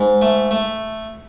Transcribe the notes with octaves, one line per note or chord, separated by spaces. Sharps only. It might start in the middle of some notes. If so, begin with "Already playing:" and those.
Already playing: G#2
A3
A3